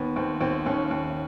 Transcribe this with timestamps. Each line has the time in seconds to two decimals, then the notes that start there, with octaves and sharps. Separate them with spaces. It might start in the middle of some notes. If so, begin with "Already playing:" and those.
Already playing: D#2 B3
0.16 D#2 C4
0.41 D#2 C4
0.66 D#2 C#4
0.91 D#2